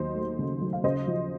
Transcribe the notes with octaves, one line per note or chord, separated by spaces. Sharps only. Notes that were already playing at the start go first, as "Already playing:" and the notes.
Already playing: D#2 F#3 C5 D#5
A3
C#3
F#3
F5
C#3 C5 D#5
F3